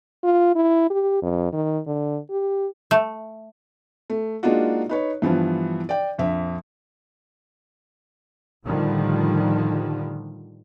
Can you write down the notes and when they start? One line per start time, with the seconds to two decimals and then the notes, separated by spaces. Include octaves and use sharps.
0.24 F4
0.55 E4
0.90 G4
1.22 F2
1.53 D#3
1.86 D3
2.30 G4
2.91 A3
4.10 A3
4.43 G#3 A#3 D4 D#4 F4 F#4
4.89 D#4 B4 C#5
5.22 G2 E3 F3 B3 F4
5.89 D5 G5
6.18 A#1 F2 E5
8.64 A2 D3 D#3 F3 G3